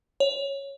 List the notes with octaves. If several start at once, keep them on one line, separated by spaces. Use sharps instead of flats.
C#5